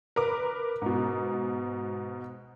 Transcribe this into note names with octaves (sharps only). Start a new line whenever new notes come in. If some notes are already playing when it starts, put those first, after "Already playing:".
A#4 B4 D6
G#2 B2